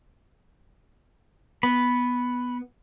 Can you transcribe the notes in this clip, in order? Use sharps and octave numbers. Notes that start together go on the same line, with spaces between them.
B3 B5